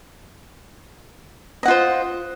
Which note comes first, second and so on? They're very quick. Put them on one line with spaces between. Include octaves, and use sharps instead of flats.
D#5 F#5 F4 C5